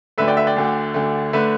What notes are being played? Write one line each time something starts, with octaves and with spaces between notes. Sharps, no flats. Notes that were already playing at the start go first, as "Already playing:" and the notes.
D2 D3 A3 B4 E5
D5 G5
B4 E5
D5 G5
D2 D3 A3
D2 D3 A3
D3 A3 B4 E5